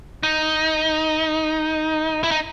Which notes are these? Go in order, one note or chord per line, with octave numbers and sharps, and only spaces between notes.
D#4
E4
D#4